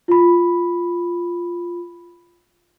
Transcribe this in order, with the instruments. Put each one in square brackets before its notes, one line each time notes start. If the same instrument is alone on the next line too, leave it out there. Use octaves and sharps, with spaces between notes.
[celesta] F4 B5